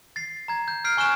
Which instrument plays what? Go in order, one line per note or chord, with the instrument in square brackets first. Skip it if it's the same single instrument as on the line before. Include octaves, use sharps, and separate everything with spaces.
[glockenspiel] A6 C7
A#5 G#6
G6
F6 G6 C7 D7
G#5 C#6 F6 F#6 E7